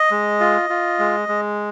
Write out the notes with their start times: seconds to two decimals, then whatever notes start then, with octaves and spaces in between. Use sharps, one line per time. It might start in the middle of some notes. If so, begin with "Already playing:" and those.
Already playing: D#5
0.11 G#3
0.40 F4
0.70 F4
0.99 G#3
1.28 G#3